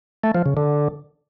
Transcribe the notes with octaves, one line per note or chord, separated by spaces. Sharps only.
A3
F3
C#3
D3